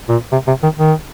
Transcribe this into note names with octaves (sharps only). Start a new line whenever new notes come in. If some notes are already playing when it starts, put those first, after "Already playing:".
A#2
C3
C3
D#3
D#3